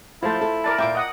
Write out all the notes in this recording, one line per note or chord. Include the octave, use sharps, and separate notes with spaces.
F3 A3 E4 F4 C5 A5
A4
A#4 D5 A5
A#2 F4 E5 G5 D6
D#5 F#5 D#6